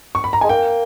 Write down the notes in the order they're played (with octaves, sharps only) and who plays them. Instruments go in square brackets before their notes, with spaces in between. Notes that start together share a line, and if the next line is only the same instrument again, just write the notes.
[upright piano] C#6
B5
A#5
[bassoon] G#3 [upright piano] G#5
[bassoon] A#3 [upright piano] G5